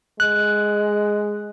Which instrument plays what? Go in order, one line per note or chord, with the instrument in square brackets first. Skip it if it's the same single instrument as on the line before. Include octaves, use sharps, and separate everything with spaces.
[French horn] G#3 [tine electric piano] F#6